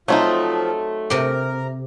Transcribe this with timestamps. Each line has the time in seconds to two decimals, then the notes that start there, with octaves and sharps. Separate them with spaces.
0.08 F3 F#3 A3 C4 D#4
1.10 C3 G4 A#4